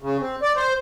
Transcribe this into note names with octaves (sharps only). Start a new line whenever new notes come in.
C#3
C4
D5
C5